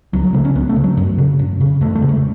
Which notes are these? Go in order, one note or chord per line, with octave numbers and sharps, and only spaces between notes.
C#2 F#3
F#3
C#3 A3
C#4
C#2 B3
A3
C#3
F#3
F#2 F#3
C#3
F#2
C#3
E2 A3
A3
C#3
A3